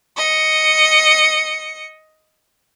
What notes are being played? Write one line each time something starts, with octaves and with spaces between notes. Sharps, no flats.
D#5 C#7